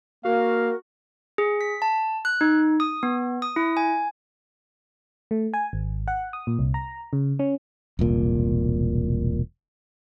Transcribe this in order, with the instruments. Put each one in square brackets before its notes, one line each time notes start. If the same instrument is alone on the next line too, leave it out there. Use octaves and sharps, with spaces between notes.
[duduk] A#3 [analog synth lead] F#4 [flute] A#4 [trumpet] F5
[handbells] G#4
B6
A5
F#6
D#4
D#6
B3
D#6
E4
G#5
[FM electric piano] A3
G#5
G#1
F#5
D#6
A#2
C2
A#5
C#3
C#4
[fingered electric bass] E1 C2 A#2